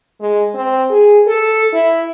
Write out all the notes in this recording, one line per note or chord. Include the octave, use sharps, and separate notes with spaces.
G#3
C4
G#4
A4
E4